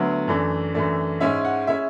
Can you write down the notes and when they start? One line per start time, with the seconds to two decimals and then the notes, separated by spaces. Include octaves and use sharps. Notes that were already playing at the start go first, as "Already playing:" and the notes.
Already playing: D2 D3 F#3 B3 E4
0.28 F#2 E3 A3 D4
0.74 F#2 E3 A3 D4
1.21 G#2 G#3 C#4 E4 E5
1.45 F#5
1.67 G#3 C#4 E4 E5